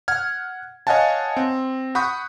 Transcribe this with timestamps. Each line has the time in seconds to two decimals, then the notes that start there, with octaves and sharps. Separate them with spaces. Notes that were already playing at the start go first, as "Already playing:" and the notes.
0.08 F#5 F6 G#6
0.87 C#5 D#5 F5 F#5 G#5 A5
1.37 C4
1.95 F#5 B5 C#6 D#6 G6